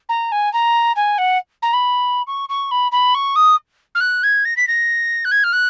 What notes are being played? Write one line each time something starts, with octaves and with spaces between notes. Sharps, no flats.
A#5
G#5
A#5
G#5
F#5
A#5
B5
C#6
C#6
B5
B5
C#6
D#6
F6
F#6
G#6
A#6
B6
A#6
F#6
G#6
F6
F#6